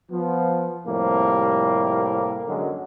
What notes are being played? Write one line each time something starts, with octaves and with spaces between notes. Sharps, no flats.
F3 B3
F2 A2 C3 G3 A#3
F#2 D3 F#3 G#3